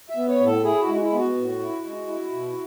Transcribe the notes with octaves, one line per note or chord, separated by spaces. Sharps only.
E5
B3
C#5
A2
A4
E4 G#4
F#4
G#3
F#4
E4
B3 F#4
A2
E4
G#3
E4
B2